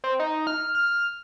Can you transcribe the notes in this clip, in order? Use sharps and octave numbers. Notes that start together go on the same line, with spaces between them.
C4
D#4
F6
F6